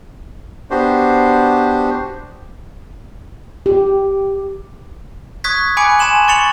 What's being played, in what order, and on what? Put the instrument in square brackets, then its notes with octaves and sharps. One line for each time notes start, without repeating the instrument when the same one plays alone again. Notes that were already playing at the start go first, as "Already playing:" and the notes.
[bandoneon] B3 D4 F#4 G4 C5
[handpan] G4
[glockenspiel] C#6 D#6 F#6 G#6 B6
G#5 B5 D6 F#6 C#7 D7
G#5 A5 C6 E7 F#7
C#6 A6 C#7 F7 F#7